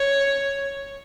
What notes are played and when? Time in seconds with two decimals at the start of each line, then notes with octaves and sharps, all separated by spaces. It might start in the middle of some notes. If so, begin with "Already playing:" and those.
Already playing: C#5